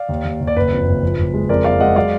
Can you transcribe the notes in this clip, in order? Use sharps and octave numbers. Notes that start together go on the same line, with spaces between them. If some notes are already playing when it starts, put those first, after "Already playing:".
Already playing: D5 F5
D#2
D#2
D#2
D5
F#1 B4
F2
F#1
F3
F#1
G#3
F2 A#4 D5
G#3 D5 F5
G#3 D#5 F#5
F#3 D5 F5